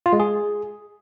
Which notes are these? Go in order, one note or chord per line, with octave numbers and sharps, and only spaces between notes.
F4
G#3
G#4